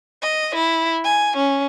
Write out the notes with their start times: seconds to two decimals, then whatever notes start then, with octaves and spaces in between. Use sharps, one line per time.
0.22 D#5
0.55 E4
1.04 G#5
1.36 C#4